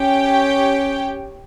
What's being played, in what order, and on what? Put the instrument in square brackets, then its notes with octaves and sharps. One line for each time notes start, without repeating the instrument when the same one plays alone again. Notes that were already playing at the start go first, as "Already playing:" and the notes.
Already playing: [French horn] C#4 [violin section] G4 C#5 G5